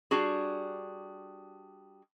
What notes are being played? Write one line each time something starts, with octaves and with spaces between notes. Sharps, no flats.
G3 D4 F#4 G#4